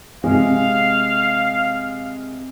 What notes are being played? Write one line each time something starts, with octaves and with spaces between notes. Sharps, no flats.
C3 G#3 F5